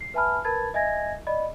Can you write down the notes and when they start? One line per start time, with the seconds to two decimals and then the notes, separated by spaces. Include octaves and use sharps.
0.01 C7
0.14 B4 E5 G#5 A5 B5 F6
0.44 A#4 B4 A5 B5 G#6 A6
0.74 D#5 E5 G#5 G#6 A#6
1.27 D5 D#5 B5